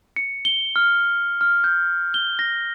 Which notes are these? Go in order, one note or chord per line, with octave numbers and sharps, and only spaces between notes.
C#7
G7
F6
F6
G6
G7
A#6